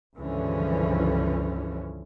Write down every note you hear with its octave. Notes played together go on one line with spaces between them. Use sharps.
C#2 G2 D3 E3 F3 C#4